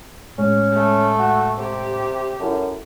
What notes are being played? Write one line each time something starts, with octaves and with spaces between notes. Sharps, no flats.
A2 G#3 C#4
A3
F#4
C3 G4
F#2 E4 A4